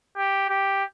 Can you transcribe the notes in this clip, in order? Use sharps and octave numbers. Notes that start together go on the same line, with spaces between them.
G4
G4